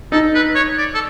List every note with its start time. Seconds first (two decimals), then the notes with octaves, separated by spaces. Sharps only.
0.12 D#4 A4
0.35 B4
0.55 C#5
0.78 D5
0.94 A4